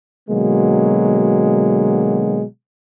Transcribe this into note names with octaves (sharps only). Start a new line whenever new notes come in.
B2 D3 F#3 G#3 A#3